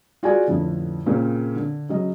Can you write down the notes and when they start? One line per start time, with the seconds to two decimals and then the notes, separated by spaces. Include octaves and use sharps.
0.23 F4 F#4 G#4 D5 G#5
0.48 A1 F2 D3
1.06 A#2 C#3 A#3 C4
1.56 D3
1.89 C#3 F#3 D#5